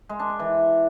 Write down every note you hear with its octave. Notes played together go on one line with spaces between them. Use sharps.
G#3
D4
D4
E3